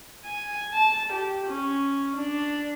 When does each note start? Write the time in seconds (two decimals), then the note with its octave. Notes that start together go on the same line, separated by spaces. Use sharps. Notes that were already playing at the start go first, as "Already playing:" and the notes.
0.25 G#5
0.74 A5
1.12 G4
1.46 C#4
2.16 D4